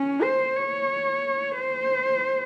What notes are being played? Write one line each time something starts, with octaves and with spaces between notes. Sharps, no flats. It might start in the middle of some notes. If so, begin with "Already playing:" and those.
Already playing: C#4
C5
C#5
C5